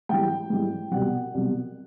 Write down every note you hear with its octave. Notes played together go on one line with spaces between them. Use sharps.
G#2 E3 G3 G5
G#2 E3 G3
C2 B2 G3 F#5
C2 B2 G3